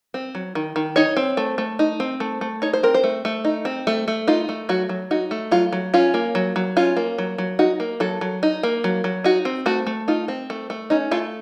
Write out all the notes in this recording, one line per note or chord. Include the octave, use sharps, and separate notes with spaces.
C4
F#3
D#3
D#3
D#4 C#5
C4
A3
A3
D#4
C4
A3
A3
D#4 C#5
C5
C4 A#4
C5
A3
A3
D#4
C4
A3
A3
D#4 F4
A3
F#3 F#4
F#3
D#4 F#4
A3
F#3 F4
F#3
C#4 F4
A#3
F#3
F#3
C#4 F4
A#3
F#3
F#3
D#4 F#4
A#3
F#3 A4
F#3
D#4
A#3
F#3
F#3
D#4 F#4
C4
A3 F#4
A3
D#4 F4
C4
A3
A3
C#4 D#4
A3 F4